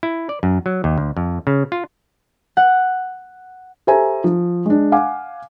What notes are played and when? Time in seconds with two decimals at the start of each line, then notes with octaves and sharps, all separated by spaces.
0.03 E4
0.29 D5
0.43 F#2
0.66 F#3
0.84 D#2
0.98 D2
1.17 F2
1.47 C#3
1.72 F4
2.57 F#5
3.87 G4 A4 C5 E5 G#5 A#5
4.24 F3
4.66 G#3 D4
4.92 F5 F#5 G#5 D6